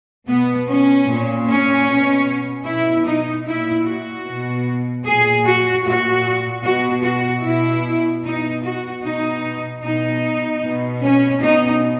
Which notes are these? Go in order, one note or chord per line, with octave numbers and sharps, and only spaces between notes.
B2 B3
C#4
A#2
C#4
B2
B2 E4
D#4
A#2 E4
F#4
B2
A#2 G#4
F#4
A#2 F#4
B2 F#4
F#4
B2 E4
B2 D#4
F#4
B2 D#4
B2 D#4
B2
C#4
B2 D#4